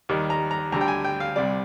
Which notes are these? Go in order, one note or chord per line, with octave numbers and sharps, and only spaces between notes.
D#2 D#3 G3
A#5
A#5
D2 D3 G3 A#5
G5
G#5
G5
F5
C2 C3 G3 D5